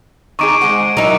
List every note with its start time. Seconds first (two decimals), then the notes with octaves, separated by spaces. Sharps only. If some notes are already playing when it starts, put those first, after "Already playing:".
0.39 D#3 D#4 G#4 C#6 D6 D7
0.61 G#3 C5 F#5
0.97 F#3 D#4 E4 A#4